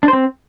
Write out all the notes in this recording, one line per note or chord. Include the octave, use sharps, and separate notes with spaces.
D4
C5
C4